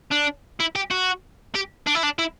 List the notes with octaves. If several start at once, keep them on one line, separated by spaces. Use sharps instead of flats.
D4
E4
G4
F#4
G4
D4
E4
D4
E4